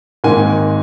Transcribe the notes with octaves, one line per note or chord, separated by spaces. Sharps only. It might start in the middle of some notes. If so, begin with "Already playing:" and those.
G#1 G#2 D#3 A#3 D#4 G#5